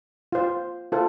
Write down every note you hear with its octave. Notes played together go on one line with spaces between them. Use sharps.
F4 C5
F4 A4 C5